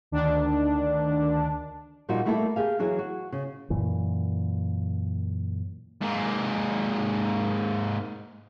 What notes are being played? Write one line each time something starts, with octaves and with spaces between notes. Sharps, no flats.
D2 D#3 D4
A#2 F3 G3 A#3 D#4 F#4
G3 A3 A#3 E4 F#4 A4
G4 G#4 F5
E3 F#3 E4 G#4
F#4
C#3
F#2 A#2 E3
G#2 A#3